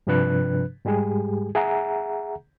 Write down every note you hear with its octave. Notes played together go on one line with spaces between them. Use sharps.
G2 C3 F3 D4 B4 F#6
G#2 G3 G#3 G4 G#4
G#4 E5 F#5 A#5